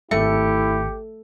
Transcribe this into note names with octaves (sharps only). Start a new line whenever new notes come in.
G#1 A3 E4 G4 A4 C#7